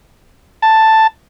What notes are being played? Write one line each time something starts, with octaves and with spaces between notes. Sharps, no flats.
A5